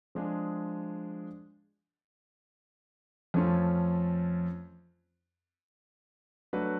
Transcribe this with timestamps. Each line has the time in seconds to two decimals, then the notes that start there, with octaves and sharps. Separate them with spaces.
0.15 F3 G#3 D4 G#4
3.34 F2 F3 A3 C#4 F4
6.53 F#3 A3 D4 F#4 B4